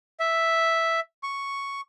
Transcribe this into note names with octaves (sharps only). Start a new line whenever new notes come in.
E5
C#6